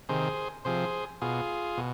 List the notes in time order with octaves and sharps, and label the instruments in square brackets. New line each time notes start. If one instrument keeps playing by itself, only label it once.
[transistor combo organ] C3 D#3 G#4 C5
C3 F3 G#4 C5
B2 F4 G#4
B2